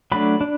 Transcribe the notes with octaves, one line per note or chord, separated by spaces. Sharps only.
F#3 A3 D4 B5
D4